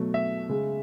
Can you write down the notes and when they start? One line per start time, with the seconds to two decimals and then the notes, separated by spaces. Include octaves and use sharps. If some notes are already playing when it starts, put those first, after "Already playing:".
Already playing: B2 F#3 A3
0.14 E5
0.49 C#3 G#3